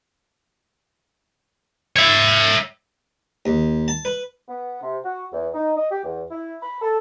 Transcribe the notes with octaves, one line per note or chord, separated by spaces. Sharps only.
C#5 E5
D#2
A5
B4
B3
C3
F#4
E2
D#4
D#5
G4
E2
E4
B5
A4